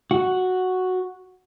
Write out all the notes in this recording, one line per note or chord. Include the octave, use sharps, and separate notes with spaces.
F#4